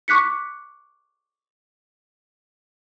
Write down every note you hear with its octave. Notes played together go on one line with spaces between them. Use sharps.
C#6 D6 F#6 B6 C#7